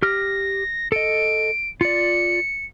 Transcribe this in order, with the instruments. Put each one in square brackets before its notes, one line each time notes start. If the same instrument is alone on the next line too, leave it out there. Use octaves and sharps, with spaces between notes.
[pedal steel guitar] G4 F6 [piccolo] A#6
[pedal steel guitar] A4 D#5 [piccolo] D7
[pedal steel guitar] F4 D5 [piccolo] C#7